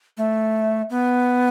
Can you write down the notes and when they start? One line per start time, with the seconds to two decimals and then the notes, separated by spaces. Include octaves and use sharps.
0.17 A3
0.90 B3